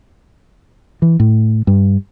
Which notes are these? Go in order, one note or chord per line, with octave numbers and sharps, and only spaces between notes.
E3
A2
G2